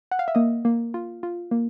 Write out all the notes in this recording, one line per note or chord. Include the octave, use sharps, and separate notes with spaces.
F#5
F5
E5
A#3 D#5
A#3
F4
F4
A#3